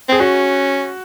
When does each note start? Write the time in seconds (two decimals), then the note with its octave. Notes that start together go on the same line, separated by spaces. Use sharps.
0.09 C4 G#4
0.20 C#4 F#4